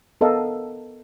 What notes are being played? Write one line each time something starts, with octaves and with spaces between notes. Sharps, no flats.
B3 A4 A#4 D#5 F5